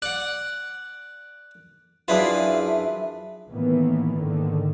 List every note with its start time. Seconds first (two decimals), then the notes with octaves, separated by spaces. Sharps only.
0.02 D5 F#5 F#6
2.08 F#2 D4 E4 F4 G#4 B4 E5
3.50 A2 D#3 E3 A#3 B3
4.15 G#2 D3 D#3